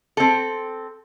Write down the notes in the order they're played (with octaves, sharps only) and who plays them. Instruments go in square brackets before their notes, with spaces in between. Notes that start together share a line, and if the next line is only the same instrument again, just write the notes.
[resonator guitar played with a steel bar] C4 A4